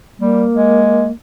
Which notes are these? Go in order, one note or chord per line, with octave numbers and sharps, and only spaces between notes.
G3 A#3
G#3